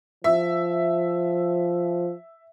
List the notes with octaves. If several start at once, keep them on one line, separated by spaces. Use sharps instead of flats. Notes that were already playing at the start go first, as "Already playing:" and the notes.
F3 E5